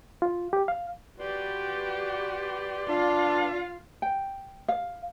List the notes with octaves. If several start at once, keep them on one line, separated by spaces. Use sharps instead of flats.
F4
G4
F5
F#4 G4 B4 D5 C6
D4 F4 F5
G5
F5